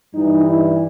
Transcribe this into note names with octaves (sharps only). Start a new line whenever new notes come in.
G2 E3 G3 D#4
E4